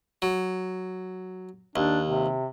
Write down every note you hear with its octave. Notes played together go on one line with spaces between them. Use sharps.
F#3
D#2 D4
C3